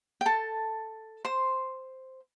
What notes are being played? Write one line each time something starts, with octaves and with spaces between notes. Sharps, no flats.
G5
A4 A5
C5 C6